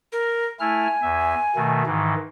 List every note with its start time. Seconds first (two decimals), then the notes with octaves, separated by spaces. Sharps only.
0.12 A#4
0.60 A3 E4 G#5 F6
1.02 E2 E5
1.55 B2 D#3 A3
1.86 G#2 D#3 E3